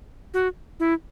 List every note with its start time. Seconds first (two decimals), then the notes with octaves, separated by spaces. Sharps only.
0.34 F#4
0.80 E4